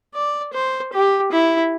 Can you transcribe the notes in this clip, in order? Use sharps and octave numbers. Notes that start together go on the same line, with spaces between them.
D5
C5
G4
E4